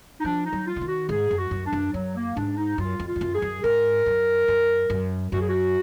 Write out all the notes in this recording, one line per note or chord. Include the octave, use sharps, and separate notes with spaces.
D#4
F3 D4
D#4
F#3
F4
D3
D#3
F#4
G#2 G#4
F#2
F#4
F#2
D4
F#2
F#2 F#3
A#3
G#2 D4
D#4
F#2 F4
F2
F4
F2
F#2
G#4
F#2
G#2 A#4
F#2
F#2
F#2
F#2 F#4
G#4
F#4